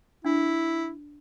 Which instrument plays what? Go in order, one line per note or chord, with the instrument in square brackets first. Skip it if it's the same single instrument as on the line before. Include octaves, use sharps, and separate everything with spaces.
[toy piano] D4 [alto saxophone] E4